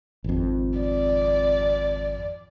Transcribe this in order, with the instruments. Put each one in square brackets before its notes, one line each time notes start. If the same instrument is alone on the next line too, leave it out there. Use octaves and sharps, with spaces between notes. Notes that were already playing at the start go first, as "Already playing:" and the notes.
[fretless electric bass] G#1 F2
[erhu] D5